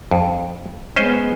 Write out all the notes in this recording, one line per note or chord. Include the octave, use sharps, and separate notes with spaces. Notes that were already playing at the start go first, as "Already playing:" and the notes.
F2
G#3 B3 C#4 C5 D#5